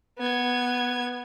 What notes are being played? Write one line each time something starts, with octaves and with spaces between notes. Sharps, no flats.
B3 G#6